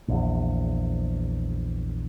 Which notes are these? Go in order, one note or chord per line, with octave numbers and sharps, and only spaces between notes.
A#1 E2